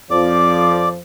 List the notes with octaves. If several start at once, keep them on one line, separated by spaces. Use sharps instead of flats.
F2 F3 D5 D6